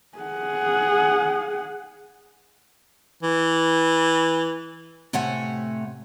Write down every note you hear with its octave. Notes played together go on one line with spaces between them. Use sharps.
G#4 F#5
E3
A2 C3 A3 C#5 F#5 G#5